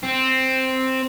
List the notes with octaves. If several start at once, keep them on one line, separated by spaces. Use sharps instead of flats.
C4